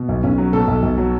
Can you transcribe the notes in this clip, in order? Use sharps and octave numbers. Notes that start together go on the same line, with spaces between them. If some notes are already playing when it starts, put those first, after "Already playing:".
Already playing: B2
B1
B1 C#4
F#3
B2 A4
B1
B1
F#3